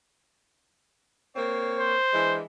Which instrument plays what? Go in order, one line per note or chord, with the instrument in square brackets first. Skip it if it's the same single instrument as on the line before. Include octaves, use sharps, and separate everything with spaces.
[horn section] A#3 C4 C#5
[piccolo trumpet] C5
[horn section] E3 G#3 D4